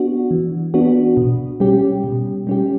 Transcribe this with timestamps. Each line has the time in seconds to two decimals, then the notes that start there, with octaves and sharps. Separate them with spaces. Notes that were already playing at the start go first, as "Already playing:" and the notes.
Already playing: B3 D4 F#4
0.31 E3
0.74 B3 D4 F#4
1.17 B2
1.60 G3 C#4 G4
2.04 B2
2.47 G3 C#4 G4